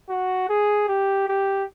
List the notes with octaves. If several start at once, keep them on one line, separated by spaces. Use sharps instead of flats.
F#4
G#4
G4
G4